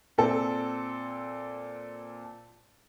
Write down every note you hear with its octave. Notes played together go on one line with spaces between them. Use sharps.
A#2 C4 A4